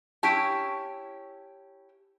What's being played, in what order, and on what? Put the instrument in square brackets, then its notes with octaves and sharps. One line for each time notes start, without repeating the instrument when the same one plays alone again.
[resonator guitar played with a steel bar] C#4 E4 G4 [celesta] A5 B6 D7